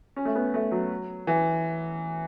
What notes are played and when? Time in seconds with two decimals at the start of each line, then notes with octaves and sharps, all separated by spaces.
0.16 C#4
0.25 A3
0.35 B3
0.54 A3
0.72 F#3
1.27 E3